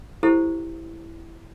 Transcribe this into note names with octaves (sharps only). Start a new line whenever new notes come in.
E4 G4 A4 C5